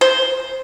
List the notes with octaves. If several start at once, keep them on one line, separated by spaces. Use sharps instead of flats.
C5